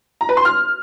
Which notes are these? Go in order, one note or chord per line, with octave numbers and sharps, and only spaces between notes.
A#5
B4
C6
F6